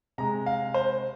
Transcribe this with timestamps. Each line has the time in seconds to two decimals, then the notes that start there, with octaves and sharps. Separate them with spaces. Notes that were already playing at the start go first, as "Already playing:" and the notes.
0.18 C3 G#3 A#5
0.46 F5
0.74 C5